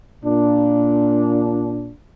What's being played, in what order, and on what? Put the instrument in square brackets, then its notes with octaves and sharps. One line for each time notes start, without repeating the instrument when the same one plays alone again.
[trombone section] A#2 D4